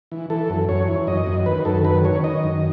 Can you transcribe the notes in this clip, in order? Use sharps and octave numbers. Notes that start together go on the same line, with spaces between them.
E3
E3 A4
F#2
F#2 C#5
E3
F#2 D#5
F#2
D#3 B4
F#2 A4
D#3 B4
D#3 C#5
D#3 D#5
F#2